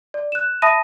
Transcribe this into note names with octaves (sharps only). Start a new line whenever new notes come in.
D5
F#6 E7
E5 A5 B5 D#6 A#6 D#7